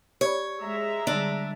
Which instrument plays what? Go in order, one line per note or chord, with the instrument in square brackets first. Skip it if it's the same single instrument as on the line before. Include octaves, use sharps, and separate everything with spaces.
[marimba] G4 D5 B5 [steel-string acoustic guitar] C#5
[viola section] G#3 E5 A#5
[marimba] D3 G3 [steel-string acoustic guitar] D4